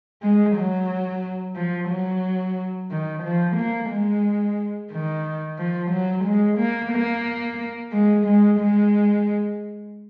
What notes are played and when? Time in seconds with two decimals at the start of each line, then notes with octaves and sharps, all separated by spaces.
0.22 G#3
0.56 F#3
1.56 F3
1.89 F#3
2.91 D#3
3.24 F3
3.57 A#3
3.90 G#3
4.91 D#3
5.58 F3
5.91 F#3
6.25 G#3
6.58 A#3
6.92 A#3
7.93 G#3
8.26 G#3
8.60 G#3